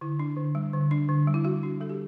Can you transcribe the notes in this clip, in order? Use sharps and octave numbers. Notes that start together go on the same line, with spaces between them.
D3 E4
D4
D3
G3
D3
D4
D3
G3
E4
G3 F#4
D4
G3 A4
G4